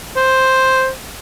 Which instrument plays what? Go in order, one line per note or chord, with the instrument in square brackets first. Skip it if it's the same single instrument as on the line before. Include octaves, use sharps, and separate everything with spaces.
[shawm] C5